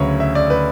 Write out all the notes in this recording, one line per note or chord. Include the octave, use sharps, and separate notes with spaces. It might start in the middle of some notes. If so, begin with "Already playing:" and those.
Already playing: D2 C#3 F#3 B4 C#5
E5
D5
B4